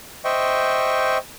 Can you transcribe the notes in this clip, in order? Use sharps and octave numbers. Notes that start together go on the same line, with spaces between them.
C5 D#5 E5 G5 C#6